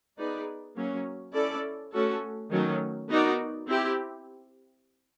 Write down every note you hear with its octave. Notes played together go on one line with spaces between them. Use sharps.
B3 D#4 G#4 B4 D5
F#3 A#3 C#4
C#4 E4 A4 D5
A3 C#4 F#4 A4
D#3 F#3 A3 C#4
B3 D#4 F#4 A#4 D5
C4 E4 G4